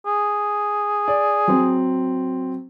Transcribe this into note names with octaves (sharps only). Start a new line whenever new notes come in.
G#4
D5
F#3 C4